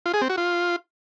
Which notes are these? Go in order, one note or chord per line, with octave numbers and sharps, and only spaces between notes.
F4
G#4
C4
F#4
F4